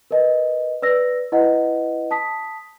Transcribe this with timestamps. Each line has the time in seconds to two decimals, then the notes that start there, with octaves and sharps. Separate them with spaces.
0.11 A#4 B4 D#5
0.82 B4 D5 E6 A#6
1.32 E4 B4 D#5 F#5
2.11 A5 D#6 B6